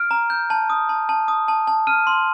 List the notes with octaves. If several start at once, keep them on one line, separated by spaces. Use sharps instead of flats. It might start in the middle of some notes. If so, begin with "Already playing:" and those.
Already playing: F6 D7
A#5
G6
A5
D#6
A5
A5
D#6
A5
A5
F6 D#7
C6